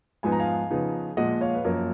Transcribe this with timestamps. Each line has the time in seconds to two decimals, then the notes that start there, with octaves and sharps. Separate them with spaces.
0.23 G#2 F3 B3 D#4 G#5
0.32 A#5
0.40 F5 G#5
0.71 C#3 F3 B3 D#4
1.17 A#2 F3 G#3 D#5 F#5
1.41 C#5 F5
1.55 B4
1.64 F#2 F3 A#3 A#4 C#5